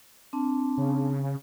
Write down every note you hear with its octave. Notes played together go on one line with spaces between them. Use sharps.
C4 D4 A5
C#3